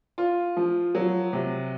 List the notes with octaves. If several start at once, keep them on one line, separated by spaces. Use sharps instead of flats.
F4
F3
F#3
C3